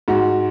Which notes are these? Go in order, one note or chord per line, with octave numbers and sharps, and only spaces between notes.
G#2 F#4